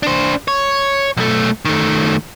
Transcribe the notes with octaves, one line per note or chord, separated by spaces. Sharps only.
D4 C5
C#5
B1 A3
D#3 A3